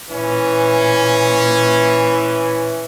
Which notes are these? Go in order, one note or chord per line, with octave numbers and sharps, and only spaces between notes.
A#2 E3 C#4